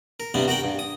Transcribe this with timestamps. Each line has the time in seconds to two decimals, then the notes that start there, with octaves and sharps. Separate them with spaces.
0.20 A#4
0.34 G2 C3 G3 B3 C4
0.48 F#4 A#4 F#5 G5
0.64 G2
0.79 D#6